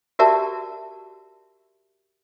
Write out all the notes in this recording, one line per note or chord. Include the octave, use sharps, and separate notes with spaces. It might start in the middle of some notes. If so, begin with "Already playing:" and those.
F#4 G4 A#4 D5 E5 A5